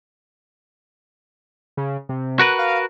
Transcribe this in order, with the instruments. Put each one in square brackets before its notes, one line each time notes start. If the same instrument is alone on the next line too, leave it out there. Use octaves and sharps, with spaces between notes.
[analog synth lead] C#3
C3
[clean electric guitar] F#4 A#4 B4
[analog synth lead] F5